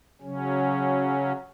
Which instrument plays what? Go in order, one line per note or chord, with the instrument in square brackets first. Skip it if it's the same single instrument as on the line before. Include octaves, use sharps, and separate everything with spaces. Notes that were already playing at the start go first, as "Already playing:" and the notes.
[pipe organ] C#3 F#3 C#4